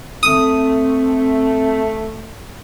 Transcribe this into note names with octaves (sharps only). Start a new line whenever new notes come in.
A3 C4 D#6